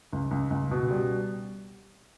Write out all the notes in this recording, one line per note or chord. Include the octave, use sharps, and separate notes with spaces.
C#2
C#2
C#2
B2
G3